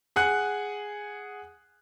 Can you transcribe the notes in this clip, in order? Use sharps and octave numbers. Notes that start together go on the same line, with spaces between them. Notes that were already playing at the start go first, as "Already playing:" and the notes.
G#4 F#5 G#5 F#6